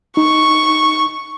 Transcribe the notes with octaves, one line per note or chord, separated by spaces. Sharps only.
D#4 C#6